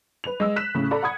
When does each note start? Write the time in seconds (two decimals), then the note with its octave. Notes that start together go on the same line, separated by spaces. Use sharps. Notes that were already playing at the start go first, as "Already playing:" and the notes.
0.24 B4 F7
0.40 G#3 E6
0.56 F#6 B6 E7
0.75 A2 C#3
0.91 A4 D5 A#5 B5
1.03 F#5 B5 D#6 G#6